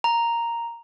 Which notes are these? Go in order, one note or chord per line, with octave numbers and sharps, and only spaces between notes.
A#5